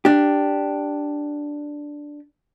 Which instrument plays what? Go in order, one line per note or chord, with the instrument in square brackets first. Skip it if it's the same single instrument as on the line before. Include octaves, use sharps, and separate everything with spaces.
[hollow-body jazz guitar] D4 G4